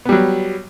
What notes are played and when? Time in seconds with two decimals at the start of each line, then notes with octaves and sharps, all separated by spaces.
0.05 B3
0.09 G3
0.12 F#3